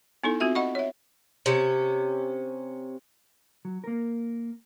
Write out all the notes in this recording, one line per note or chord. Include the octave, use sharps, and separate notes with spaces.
B3 D#4 E4 A4
C4 F4 F#4 E5
D#5 F#5 B5 C#6
C#5 E5
C3 C#4
F#3
A#3 A#4